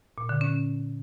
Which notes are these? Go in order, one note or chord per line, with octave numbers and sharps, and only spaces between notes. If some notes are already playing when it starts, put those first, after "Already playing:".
A#2
D3
C#4